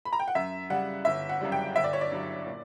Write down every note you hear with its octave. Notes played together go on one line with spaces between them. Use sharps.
B5
A#5
G5
F#5
F#2 E5
C#3 G3 F#5
G1 E5
F#5
F#2 C#3 G3
G5
G1 E5
D5
C#5
D5
G2 F#3
A#2